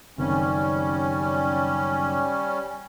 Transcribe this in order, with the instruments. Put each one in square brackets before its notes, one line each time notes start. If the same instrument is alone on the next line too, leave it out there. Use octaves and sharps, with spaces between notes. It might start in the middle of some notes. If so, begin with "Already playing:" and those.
[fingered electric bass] F#1 D#3 C4 [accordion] G3 C#4